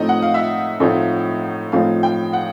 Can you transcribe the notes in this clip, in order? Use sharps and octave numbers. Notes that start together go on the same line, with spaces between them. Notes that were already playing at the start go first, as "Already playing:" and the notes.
Already playing: A2 F3 A3 C4 D#4 D#5
F#5
F5
E5
A2 F3 A3 C4 D#4
A2 F3 A3 C4 D#4 F5
G5
F#5